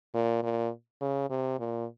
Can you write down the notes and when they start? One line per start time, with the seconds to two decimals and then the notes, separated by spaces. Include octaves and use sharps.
0.14 A#2
0.43 A#2
1.01 C#3
1.30 C3
1.59 A#2